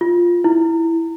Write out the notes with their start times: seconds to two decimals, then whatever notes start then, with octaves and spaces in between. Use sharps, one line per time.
0.01 F4
0.44 E4